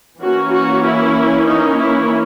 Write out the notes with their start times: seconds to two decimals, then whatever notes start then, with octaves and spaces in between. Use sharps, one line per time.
0.22 E3 A#3 C#4 F#4
0.53 F#4
0.84 E4
1.47 D#4
1.79 E4